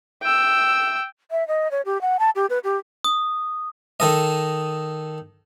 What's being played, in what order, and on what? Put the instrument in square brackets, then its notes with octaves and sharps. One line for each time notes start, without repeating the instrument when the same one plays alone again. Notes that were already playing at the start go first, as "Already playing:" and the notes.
[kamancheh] G5 E6
[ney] E5
D#5
C#5
G4
F#5
A5
G4
B4
G4
[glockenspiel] D#6
[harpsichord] D#3 A4 D#5